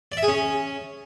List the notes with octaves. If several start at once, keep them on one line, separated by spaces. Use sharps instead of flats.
D5
E5
G#4
C#4